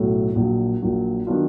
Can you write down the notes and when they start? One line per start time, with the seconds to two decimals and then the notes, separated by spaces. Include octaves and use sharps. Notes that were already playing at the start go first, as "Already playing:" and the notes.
Already playing: B1 A2 F#3 A3
0.35 A#1 A#2 F#3
0.82 A#1 A#2 F#3
1.27 D#3 F#3 B3 D4 F4